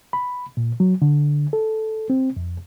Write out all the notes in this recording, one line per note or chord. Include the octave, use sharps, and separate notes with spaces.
B5
A#2
F#3
D3
A4
C4
F2